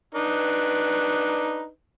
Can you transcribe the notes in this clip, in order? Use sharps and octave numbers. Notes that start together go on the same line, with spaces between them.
D4 D#4 B4